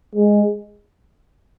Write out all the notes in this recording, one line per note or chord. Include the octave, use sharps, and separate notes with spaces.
G#3